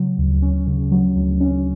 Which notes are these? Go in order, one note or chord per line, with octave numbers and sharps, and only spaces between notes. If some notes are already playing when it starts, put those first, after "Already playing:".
Already playing: C#3 F#3
D2
C#4
C#3
F#3
D2
C#4